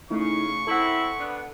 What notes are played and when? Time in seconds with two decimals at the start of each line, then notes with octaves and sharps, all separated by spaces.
0.11 C#3 A3 D#4 E4 C#6
0.67 C4 E4 A4 F#5
1.19 B3 D4